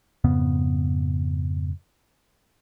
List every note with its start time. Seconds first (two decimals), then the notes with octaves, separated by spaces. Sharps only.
0.24 F2 G#2 C#3 B3